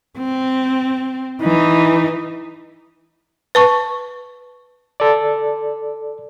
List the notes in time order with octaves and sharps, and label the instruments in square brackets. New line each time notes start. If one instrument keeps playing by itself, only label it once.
[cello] C4
E3 D#4
[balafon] B4 A5 C#6
[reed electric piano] A4 D5